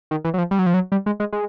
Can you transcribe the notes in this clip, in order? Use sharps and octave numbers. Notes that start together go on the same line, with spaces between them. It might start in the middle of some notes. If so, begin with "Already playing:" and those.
D#3
E3
F#3
F3
G3
F#3
F3
F#3
G3
G#3
G#3
G#3